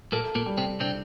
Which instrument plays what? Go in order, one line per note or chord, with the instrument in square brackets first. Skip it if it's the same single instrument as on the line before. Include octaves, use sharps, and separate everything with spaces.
[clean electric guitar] A#2 A#3 [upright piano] A4
[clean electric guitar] A#2 A#3
[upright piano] G3
[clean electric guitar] C3 C4
[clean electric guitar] C3 C4 [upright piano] D4